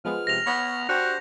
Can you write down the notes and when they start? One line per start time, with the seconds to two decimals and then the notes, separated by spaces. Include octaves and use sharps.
0.05 F3 G#3 B3 F6
0.27 C3 A#6 F7
0.47 B3 C#5
0.89 D4 F#4 G4 C5 A5